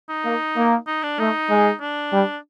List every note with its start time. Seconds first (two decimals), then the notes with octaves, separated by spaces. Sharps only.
0.09 D#4
0.25 A#3
0.56 A#3
0.87 D#4
1.03 D4
1.19 A3 D#4
1.49 G#3
1.81 D4
2.12 G3